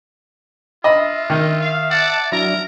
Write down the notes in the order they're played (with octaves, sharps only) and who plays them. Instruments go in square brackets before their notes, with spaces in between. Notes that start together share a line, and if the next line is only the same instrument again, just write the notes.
[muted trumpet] F4 [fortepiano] D#5 B5 [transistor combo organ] E5
[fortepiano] D#3 [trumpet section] A#3 D#4 D#5
[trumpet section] F5
[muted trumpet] D5 [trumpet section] F#5 A5
[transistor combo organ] F#3 D4 [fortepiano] E4 [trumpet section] A#4 [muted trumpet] A#5